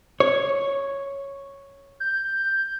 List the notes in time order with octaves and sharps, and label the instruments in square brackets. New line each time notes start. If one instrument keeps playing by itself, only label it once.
[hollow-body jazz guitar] C#5
[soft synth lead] G6